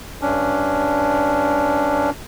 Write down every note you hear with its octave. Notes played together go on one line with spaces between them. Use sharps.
G2 C#4 D4